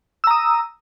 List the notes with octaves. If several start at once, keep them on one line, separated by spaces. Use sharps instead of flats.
A#5 D#6 E6